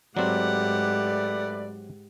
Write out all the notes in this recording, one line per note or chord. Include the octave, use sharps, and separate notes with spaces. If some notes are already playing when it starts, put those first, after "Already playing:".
G#2 F#3 A3 C4 G4 B4 D5 F#5